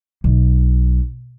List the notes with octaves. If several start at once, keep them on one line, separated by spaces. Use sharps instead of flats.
B1